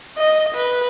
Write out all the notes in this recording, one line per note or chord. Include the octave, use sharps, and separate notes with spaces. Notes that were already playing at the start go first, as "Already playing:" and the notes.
D#5
B4